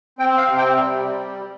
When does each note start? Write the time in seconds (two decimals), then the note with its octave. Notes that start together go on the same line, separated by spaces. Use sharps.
0.19 C4 G5
0.38 F5
0.48 C3
0.58 G5
0.77 G3